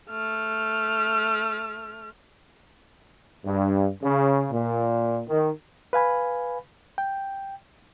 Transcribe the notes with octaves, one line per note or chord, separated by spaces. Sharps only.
A3 F6
G2
C#3
A#2
D#3
B4 F5 G#5 B5
G5